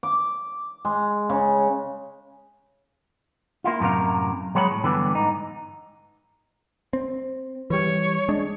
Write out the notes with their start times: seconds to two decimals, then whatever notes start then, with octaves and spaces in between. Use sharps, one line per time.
0.03 D6
0.85 G#3
1.30 C#3
3.64 A#3 E4 F4
3.80 F#2 A2 C3 A#4 F5
4.55 F#3 G#3 C#5 F#5 B5
4.71 A2
4.84 G2 D3 E3 B3
5.15 G#2 D#4
6.93 C4
7.70 E3 G3 C#5
8.29 G#3 D4